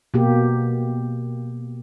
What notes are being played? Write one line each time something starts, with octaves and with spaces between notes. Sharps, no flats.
B2 A#3 G4